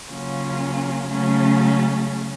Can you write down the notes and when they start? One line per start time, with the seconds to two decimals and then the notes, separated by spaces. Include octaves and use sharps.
0.11 C#3 F#3 A#3 C#4 F4
1.09 C#3 F#3 A3 C#4